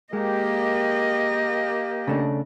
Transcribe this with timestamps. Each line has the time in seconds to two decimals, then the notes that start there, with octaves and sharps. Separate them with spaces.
0.13 G#3 A#3 G4 D#5
2.07 C#3 A3 D4